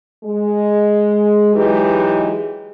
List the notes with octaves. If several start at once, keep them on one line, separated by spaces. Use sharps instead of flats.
G#3
E3 F#3 G#3 D#4 G4 B4